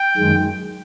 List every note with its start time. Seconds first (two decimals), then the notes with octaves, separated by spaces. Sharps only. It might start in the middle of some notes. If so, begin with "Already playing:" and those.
Already playing: G5
0.17 F#2 D#3 G#3